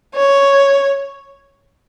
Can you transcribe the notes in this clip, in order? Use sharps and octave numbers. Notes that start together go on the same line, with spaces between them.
C#5